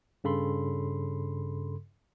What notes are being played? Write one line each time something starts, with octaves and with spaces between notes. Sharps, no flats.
G2 C#3 A4 B5 C6